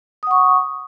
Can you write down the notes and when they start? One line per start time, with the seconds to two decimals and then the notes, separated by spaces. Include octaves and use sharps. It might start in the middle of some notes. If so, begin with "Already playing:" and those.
0.23 D#6
0.27 F#5
0.31 C#6